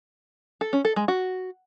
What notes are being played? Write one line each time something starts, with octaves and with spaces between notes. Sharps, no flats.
A4
C#4
A4
G#3
F#4